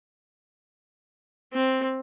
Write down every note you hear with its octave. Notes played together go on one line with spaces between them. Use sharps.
C4